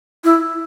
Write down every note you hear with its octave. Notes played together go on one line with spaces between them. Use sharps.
E4